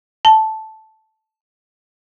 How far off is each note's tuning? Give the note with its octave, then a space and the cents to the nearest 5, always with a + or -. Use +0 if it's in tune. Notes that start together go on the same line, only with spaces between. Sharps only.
A5 -5